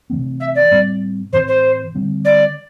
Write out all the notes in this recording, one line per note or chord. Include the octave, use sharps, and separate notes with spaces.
C3 E3 A3 C4
E5
D5
A2 G3 C4
A2 E3 C4 C5
C5
D3 G3 C4
D5